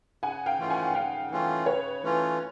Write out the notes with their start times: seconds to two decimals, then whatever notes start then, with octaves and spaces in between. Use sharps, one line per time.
0.23 C#3 F#5 G#5
0.46 F5 G5
0.58 E3 A3 C#4 F4
0.70 F#5 G#5
0.84 F#5
0.95 C#3 F5 G5
1.31 E3 A3 C#4 F4
1.66 C#3 B4 C#5
2.03 E3 A3 C#4 F4